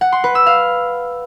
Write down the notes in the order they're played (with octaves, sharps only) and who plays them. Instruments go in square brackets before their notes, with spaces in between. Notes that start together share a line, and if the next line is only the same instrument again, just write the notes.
[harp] F#5
C6
B4
E6
F5